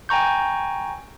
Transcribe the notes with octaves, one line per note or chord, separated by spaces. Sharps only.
G5 G#5 A#5 C#6 G6